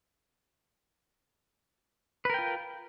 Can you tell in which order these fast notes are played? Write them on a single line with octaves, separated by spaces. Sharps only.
B4 A#4 G5 F4